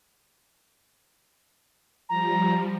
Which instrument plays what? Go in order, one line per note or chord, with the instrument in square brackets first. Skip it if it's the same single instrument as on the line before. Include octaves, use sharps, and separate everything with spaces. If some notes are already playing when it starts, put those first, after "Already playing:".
[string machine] F3 G3 [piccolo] A#5